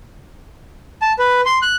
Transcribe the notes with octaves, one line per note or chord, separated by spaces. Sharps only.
A5
B4
C6
F#6